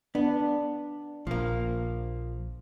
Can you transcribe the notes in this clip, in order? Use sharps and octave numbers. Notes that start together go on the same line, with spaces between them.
B3 D4
A#1 F3 A#3